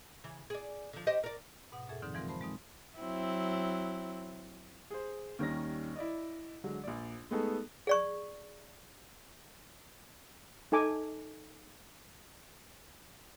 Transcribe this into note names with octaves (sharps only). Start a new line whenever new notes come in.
C#3 E3
G#4 D5
D3 F3
G4 C5 D#5
A#4 D5
G#2 B2 F#5 D#6
F2 A#2 G#4 A4 E5
D3 E3 F#3 C4 D#4
E3 F3 G#3 C4 F4 A#4
C5 A5 B5 C6
G#3 C4 D#4
F#3 C4 E4
G#4 C5
D#2 D#3 G3 C#4 A#6
E4 D5 D#5
D3 F#3 G#3
A#1 D5
G#3 A3 B3 D#4 G#4 A4
G#4 D5 C#6
D#4 A4 G#5 D6